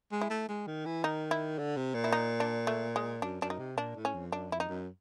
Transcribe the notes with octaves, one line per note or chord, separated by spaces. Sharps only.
G#3
E4
A3
G#3
D#3
E3
D#3 D#4
E4
D3
C3
A#2
E4
D#4
D4
A3
G#3
F#2 D4
F#2 D4
D#4
C3
A#2 D4
A2
C#4
F2
F#2 D4
F2 E4
D#4
F#2